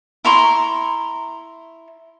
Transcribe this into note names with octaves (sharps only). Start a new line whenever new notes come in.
E4 A#5 C6 C#6